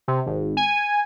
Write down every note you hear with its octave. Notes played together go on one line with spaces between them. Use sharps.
C3
G#1
G#5